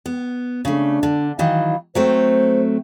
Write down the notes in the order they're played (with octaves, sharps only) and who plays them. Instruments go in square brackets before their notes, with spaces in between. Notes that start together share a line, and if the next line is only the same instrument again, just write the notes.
[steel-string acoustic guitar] B3
[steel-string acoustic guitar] C#3 A3 [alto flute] D4
[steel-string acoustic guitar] D3
[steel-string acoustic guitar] D#3 E3 F#3 [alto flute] F5
[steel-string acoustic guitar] F#3 A3 C4 [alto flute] C5